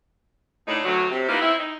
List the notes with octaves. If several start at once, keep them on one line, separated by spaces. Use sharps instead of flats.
D2 A2 D4 D#4
D2 F#3
C3
E3 A#3 B3 D#4 F4
C4 E4
D#4